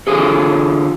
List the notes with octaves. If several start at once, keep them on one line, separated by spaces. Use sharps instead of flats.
D3 E3 F4 G#4 A4